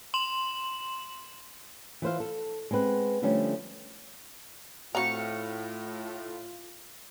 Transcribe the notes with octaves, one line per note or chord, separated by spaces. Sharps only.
C6 E7 F#7
E3 F4 C5 F5
A4
G#3 B3 C4 B4
D3 F3 G3 A3 C#4 D4
A2 C4 F4 F#4 F5 A#5 C#6